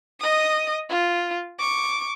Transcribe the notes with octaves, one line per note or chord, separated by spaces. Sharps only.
D#5 D#6
F4
C#6 D6